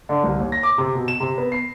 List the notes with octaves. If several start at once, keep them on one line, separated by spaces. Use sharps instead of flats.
D3
C2
D#2
A#6
D6
C3
B2
E7
C3
B3
C7